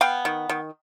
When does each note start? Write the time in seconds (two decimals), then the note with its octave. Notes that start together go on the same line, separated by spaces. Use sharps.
0.01 B3 F5 G5
0.25 D#3
0.49 D#3